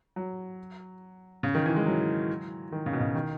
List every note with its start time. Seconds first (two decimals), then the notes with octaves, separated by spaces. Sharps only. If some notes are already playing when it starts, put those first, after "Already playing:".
0.16 F#3
1.43 C#3
1.55 D#3
1.66 E3
1.76 G#3
1.86 F#3
2.72 D#3
2.86 C#3
2.93 B2
3.00 C#3
3.15 D#3